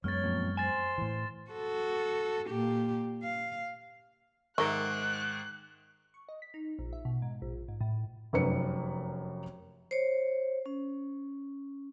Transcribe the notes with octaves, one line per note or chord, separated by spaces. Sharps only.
F#2 G#3 B3 C#5 F6 A6
F2 A#2
C5 G#5 C6 A6 E7
A2 E3
F#4 A4
A#2 G4
F5
G#2 D#3 A#4 E5 C#6 F#6
C#6
D#5
B6
D#4
A#1
E5
B2
G#2
A#1
G#2
A2
F1 F#2 B4 C#7
C5 C#5
C#4